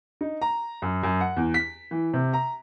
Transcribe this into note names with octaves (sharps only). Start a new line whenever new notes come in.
D#4
A#5
F#2
F#2
F#5
E2
B6
E3
C3
A#5